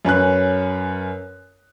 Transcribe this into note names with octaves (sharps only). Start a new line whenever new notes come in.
F#2 C#4 B4 F#6